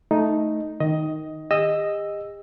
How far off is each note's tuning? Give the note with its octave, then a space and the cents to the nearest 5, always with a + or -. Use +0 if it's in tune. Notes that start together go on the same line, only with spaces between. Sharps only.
A3 -5 D#4 +0
D#3 +0 D#5 +15
G4 +45 D#5 +0 E6 +5